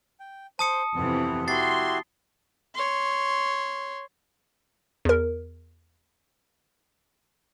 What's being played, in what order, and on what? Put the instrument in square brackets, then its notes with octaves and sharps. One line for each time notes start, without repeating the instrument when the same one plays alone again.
[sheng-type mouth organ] G5
[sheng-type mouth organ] C5 [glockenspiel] A5 D#6 C#7
[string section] F2 C3 E3 [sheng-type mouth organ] B3 C4
[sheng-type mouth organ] E4 F#4 G4 [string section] C6 [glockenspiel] A6 C7
[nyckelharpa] C#5 C6
[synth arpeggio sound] E2 A#4